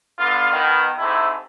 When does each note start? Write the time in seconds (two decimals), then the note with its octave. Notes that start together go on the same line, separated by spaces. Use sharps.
0.17 D3 B3 F4
0.52 B2 D#3
0.98 G#2 C3 A3 E4